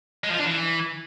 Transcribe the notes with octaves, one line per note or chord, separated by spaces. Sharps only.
G#3
F3
F4
D4
E3